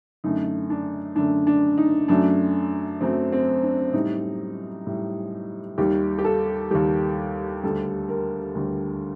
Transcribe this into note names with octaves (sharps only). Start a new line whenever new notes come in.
F#2 D3 A3 D#4
D4
F#2 D3 A3 D4
D4
D#4
F#2 F#3 A3 D4
F#2 F#3 A3 C4
C4
D4
A2 G3 D#4
A2 G3
D#2 D#3 G3 G4
G4
A4
D#2 D#3 G3 G4
D2 D3 G3 A4
A#4
D2 D3 G3